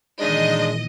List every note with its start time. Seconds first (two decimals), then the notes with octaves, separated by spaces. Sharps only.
0.21 A#2 D#3 E3 G#3 D4 D#4 D#5